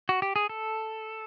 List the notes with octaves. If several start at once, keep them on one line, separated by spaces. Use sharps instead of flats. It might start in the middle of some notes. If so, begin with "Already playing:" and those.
F#4
G4
G#4
A4